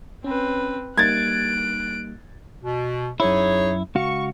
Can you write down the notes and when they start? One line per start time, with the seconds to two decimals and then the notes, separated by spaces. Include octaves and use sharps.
0.24 C4 C#4 B4
0.98 G3 A#3 D#4 F#6 G#6 A6 D7
2.62 B2
3.20 F#2 D#4 E4 G#4 C#5
3.96 C#2 F#4 F5 C#6